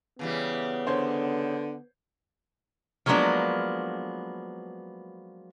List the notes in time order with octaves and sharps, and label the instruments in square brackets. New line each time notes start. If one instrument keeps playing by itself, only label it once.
[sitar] C#3 E3 G3 [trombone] B3
[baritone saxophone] D3 [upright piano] C5 C#5
[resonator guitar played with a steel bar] F3 F#3 G#3 A#3 B3 D4